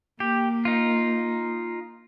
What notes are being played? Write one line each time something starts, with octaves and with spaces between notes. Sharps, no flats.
A#3 G4
D#4 F4